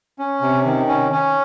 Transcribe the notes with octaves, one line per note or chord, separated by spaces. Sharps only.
C#4
C3
D#3
C#4
C#4